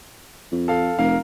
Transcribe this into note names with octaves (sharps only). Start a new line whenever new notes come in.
F2
A4 F5
F1 A#4 F5